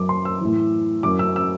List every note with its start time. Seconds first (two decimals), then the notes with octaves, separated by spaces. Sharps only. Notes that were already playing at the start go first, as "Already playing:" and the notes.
Already playing: F#2 F#3 D6
0.09 C6
0.25 E6
0.41 A2 E3
1.03 F#2 F#3 D6
1.19 E6
1.36 E6